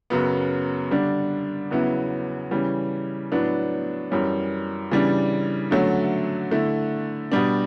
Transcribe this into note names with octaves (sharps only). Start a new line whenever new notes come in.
F#2 C#3 F#3 B3
D3 G3 D4
E2 C#3 F#3 B3 E4
C#3 E3 G3 C#4
A2 F#3 B3 D4
F#2 E3 G3 C#4
C#3 E3 G3 D4
D3 F#3 A3 C#4
D3 A3 E4
B2 G3 D4